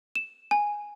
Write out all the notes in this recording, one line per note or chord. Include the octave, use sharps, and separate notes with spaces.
E7
G#5